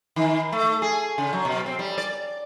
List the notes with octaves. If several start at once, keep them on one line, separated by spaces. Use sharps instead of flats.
D#3
A3
G#4
C#3
F#3
B2
C4
G3
D5